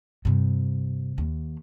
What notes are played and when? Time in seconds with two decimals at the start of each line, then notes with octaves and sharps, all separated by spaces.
0.25 G2 C3
1.18 D#2